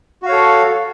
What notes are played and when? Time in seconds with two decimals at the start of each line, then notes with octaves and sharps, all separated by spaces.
0.22 F#4
0.26 F5
0.29 C#5
0.32 A4